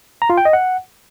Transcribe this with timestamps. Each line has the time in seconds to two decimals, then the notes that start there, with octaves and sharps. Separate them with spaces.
0.22 A#5
0.30 F4
0.38 G5
0.45 D#5
0.53 F#5